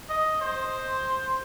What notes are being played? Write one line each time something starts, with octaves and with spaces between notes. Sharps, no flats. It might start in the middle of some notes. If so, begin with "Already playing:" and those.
D#5
C5